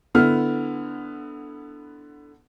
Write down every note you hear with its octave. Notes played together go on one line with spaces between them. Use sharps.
D3 B3 E4 F6